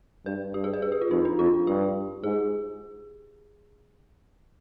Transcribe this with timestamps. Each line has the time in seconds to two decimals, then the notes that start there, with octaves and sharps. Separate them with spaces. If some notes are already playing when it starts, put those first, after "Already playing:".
0.26 G2 B4
0.54 G2 G4
0.64 G#4
0.73 B4
0.82 G#4
0.92 G4
1.01 F4
1.11 F2 D#4
1.25 D4
1.39 F2 F4
1.67 G2 G4
2.24 G#2 G#4